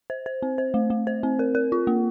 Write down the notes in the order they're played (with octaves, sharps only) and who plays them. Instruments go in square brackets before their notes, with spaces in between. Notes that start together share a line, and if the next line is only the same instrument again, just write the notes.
[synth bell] C5
C5
C4
C5
A3
A3
C5
C4
A#4
A#4
F4
A#3